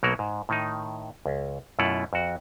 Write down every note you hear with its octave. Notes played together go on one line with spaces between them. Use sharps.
B1 B2 F#3 A#3 F#4 A#4
G#2
A2 D#3 D#4
C#2
F#2 B2 A3 E4 F4 F#5
F2 F#4